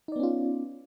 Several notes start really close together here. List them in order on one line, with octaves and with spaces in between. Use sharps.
D#4 D5 B3 C#4 F4